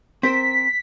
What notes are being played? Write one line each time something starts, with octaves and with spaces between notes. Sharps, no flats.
C4 A#4 C5 B6